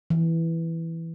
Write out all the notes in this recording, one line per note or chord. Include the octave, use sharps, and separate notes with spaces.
E3